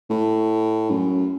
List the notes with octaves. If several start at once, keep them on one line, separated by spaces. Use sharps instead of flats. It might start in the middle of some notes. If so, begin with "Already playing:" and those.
A2
F#2